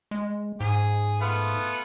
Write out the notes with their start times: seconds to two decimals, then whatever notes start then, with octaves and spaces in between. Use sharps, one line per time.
0.11 G#3
0.60 G#2 G#4
1.21 A3 B3 F4